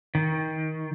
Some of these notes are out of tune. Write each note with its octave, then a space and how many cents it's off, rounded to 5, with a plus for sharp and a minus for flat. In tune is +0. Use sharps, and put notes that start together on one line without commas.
D#3 +20